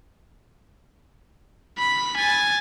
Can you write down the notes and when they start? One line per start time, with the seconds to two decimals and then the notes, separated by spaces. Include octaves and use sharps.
1.79 B5
2.17 G#5 A6